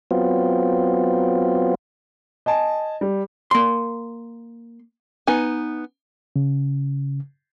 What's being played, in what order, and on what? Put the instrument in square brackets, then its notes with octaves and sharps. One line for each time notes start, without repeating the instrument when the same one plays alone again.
[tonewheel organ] F#3 B3 C4 F4
[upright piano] D#5 G#5 A5
G3
[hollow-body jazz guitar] A#3 C6
[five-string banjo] B3 D#4 G#5
[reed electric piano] C#3